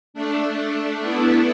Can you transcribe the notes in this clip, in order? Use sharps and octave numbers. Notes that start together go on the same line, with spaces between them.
A3 D4
A3 D4
A3 D4
B3 E4